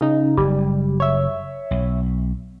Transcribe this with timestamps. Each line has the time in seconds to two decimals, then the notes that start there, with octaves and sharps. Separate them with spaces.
0.01 C#3 D#4
0.37 F#1 G3
1.00 C#5 E5
1.71 B1